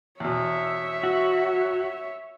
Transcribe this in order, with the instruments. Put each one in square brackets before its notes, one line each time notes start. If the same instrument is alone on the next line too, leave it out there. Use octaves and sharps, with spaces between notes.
[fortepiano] E2 B2 [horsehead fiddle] C#5 E5
[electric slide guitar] F#4